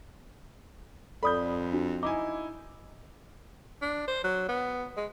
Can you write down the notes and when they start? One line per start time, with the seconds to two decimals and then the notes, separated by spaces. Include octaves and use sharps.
1.23 F2 A4 D5 B5 D#6 G6
1.73 D4 F#4
2.03 D#4 E4 G#5 D6
3.82 D4
4.08 C5
4.24 F#3
4.48 B3
4.97 G#3